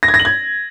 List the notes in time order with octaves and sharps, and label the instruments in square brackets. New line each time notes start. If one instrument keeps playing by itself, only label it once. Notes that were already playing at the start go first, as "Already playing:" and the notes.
[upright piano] A#6
G#6
A#6
F#7
G#6